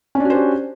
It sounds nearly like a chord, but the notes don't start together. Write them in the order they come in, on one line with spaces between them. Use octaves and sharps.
C#4 D4 F#4 C5 G4